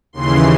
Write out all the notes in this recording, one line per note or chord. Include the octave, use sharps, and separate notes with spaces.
D#2 C#3 E3 C6